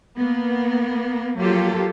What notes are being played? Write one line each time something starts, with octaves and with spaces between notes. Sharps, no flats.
A#3 B3
F3 F#3 A#3 F4 G4 A4